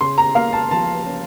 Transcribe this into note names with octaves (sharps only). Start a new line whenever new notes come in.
C#3 C6
A#5
A#3 F5
A5
F3 A5
C#4